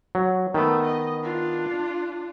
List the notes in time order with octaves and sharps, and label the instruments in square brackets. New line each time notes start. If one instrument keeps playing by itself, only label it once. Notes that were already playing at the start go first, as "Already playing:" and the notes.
[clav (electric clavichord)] F#3
[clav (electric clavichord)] D#3 B3 [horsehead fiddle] A3
[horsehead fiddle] D#5
D4 F4